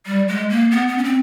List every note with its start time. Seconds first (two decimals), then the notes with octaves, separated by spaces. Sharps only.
0.06 G3
0.28 G#3
0.50 A#3
0.72 B3
0.88 B3
0.98 C#4
1.04 C4